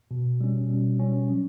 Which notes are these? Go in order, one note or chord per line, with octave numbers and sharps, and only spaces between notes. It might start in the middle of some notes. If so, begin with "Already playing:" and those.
B2
G3 C#4
B2
G3 C#4
F#3